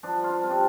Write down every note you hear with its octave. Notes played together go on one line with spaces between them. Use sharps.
F3 D4
F4
D4
C3 F4
D4